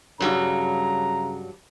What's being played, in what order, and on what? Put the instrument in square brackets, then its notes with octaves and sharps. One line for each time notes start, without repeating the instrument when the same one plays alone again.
[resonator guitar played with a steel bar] G2 F#3 G3 [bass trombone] C#3 [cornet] A#5